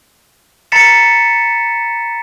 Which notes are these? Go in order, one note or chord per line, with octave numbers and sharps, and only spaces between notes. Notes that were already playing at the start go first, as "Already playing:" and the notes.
A#5 B5 A6 B6 C#7 E7